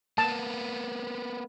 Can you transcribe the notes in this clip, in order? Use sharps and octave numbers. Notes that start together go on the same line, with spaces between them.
A#3 B3 A5